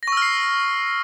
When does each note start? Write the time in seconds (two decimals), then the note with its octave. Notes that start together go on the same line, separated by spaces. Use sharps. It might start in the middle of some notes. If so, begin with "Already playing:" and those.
0.03 A#6
0.08 C#6
0.12 E6
0.17 F6
0.22 C7